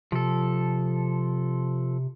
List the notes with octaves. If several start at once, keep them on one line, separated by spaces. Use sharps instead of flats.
C3 F3 A4